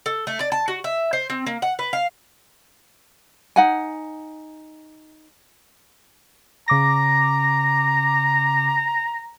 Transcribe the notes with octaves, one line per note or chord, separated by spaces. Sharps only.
A4
A3
D5
A5
F#4
E5
C5
C4
A#3
F#5
B4
F5
D#4 F#5 G#5
C#3 A#5 D6 A#6